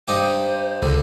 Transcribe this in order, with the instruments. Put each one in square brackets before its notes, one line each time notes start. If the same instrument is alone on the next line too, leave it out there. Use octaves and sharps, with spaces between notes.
[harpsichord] G2 D#4 G4 [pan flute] C5
[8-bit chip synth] C#2 [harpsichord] D3